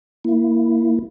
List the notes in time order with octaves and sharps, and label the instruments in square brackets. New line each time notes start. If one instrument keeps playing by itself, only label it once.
[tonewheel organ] A#3 E4